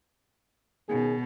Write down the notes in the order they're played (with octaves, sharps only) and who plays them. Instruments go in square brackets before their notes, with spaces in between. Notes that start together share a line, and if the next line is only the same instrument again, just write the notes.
[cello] B2 [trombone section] D#3 C#4 G#4